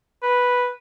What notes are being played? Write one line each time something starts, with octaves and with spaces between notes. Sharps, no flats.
B4